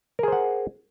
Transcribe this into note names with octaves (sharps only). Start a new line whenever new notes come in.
G#4 A#4 C5 F#5